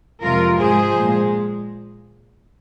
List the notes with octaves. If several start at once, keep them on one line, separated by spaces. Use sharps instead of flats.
F2 C3 F3 G#3 F4 A#4
G#2 F3 G#3 G#4 C5
A#2
G#3